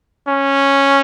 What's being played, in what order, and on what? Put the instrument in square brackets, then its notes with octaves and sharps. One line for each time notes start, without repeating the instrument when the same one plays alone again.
[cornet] C#4